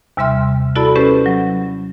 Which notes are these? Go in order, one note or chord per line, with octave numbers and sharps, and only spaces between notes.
D#2 C3 G3 E5 C6 F6
E4 F#4 A4 D5 A5 B5
C#4 G4 A4 B4 C5
F#3